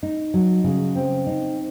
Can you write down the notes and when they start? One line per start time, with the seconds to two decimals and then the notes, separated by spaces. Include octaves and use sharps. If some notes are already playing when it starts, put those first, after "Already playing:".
0.03 D#4
0.34 F#3
0.64 C#3
0.95 C4
1.27 D#4